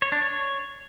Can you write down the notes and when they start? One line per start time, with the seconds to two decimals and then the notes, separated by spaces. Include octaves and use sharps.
0.02 C#5
0.12 D4
0.22 C#5